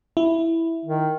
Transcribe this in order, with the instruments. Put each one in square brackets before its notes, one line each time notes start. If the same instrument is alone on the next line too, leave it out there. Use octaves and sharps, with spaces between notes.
[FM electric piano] E4
[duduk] D#3